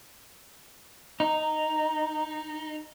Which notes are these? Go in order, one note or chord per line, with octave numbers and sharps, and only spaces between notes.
D#4 A#5